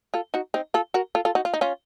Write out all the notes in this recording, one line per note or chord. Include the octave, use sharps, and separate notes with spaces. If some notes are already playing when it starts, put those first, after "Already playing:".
F4 A4
D#4 F#4
C4 D#4
F4 A4
F#4 A#4
F4 A4
F4 A4
D#4 F#4
F4
D#4
C#4 F4